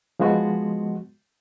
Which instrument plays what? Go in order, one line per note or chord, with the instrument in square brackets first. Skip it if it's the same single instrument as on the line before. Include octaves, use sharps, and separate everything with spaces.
[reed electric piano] F3 G#3 B3 F#4